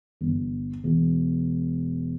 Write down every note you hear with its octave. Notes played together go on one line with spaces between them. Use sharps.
G1
E1